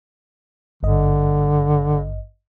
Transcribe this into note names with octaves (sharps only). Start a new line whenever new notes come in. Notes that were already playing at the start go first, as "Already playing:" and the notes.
G#1 G2 D3 D#5